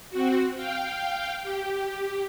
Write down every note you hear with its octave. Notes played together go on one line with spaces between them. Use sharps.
C4 F#4
F5 G5
G4